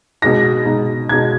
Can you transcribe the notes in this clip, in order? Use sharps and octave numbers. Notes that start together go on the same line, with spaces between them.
B2 G#3 D#4 A#6
B2 G#3 D#4
B2 G#3 D#4 G#6